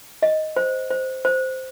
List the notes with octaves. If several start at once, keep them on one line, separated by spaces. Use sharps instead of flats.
D#5
C5
C5
C5